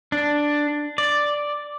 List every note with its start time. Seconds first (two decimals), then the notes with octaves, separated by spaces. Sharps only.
0.12 D4
0.98 D5